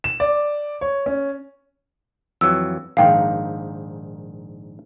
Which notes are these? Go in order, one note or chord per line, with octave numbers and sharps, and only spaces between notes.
E7
D5
C#5
C#4
F2 E3 F#3 E6
A#1 G#2 D#3 F5 G5